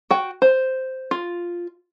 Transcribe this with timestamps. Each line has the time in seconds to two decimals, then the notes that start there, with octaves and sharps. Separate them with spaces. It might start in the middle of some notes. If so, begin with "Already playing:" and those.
0.11 F#4 G5
0.42 C5
1.11 F4